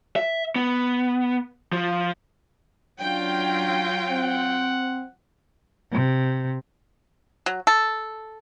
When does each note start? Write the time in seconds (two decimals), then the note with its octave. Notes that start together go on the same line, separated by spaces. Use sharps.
0.16 E5
0.56 B3
1.73 F3
3.01 F#3 C#4 D4 F4 G5
4.10 C4 F#5
5.91 C3
7.46 F#3
7.67 A4